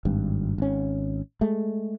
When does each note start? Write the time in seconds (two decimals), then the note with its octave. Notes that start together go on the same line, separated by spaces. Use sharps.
0.05 G#1 G2
0.58 G#1 C#4
1.41 G#3 A3